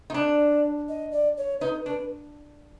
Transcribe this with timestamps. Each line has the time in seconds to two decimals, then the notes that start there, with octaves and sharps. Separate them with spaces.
0.10 D#4
0.14 D4 D5
0.88 D#5
1.12 D5
1.37 C#5
1.61 D#4 B4
1.86 D4 B4